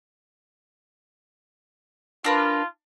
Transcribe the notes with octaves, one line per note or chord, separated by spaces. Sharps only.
D4 F4 A#4 B4